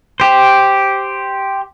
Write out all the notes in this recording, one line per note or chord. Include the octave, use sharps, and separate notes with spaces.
G4 C5